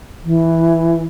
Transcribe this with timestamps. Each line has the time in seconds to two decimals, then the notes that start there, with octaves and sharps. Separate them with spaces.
0.24 E3